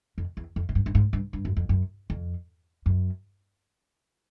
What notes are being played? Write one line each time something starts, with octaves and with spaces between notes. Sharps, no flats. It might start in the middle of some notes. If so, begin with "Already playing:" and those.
F2
E2
F2
G#2
G2
G2
G#2
G2
G2
F#2
F2
F#2
F2
F#2